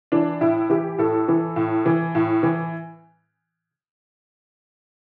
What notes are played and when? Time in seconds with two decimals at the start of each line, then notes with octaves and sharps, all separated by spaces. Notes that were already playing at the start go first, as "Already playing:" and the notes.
0.12 E3 D4
0.41 A2 E4
0.70 E3 G4
0.98 A2 A4
1.28 E3
1.56 A2
1.86 E3
2.15 A2
2.43 E3